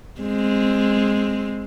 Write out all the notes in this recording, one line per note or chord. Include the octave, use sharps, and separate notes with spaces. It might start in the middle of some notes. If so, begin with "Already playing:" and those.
G#3 C4